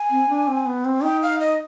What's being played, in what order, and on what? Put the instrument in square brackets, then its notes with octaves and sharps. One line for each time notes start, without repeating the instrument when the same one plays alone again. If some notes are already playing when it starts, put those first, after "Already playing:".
Already playing: [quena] G#5
[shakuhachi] C4
D4
C4
B3
C4
[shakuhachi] D#4 [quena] G5
[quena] F5
D#5